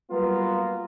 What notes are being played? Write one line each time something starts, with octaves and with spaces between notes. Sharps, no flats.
F#3 G3 A#3 B3 F4 B4